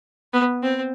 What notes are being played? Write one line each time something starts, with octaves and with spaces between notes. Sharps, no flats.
B3
C4